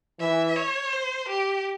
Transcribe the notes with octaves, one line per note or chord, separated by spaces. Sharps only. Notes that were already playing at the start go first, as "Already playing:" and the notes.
E3 E5
C#5
C5
G4